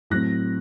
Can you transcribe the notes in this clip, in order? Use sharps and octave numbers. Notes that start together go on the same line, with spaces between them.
A2 F#3 C4 F#6 A#6